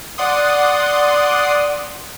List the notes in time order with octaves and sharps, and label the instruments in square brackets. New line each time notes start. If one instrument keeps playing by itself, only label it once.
[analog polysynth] D5 F#5 C6 D#6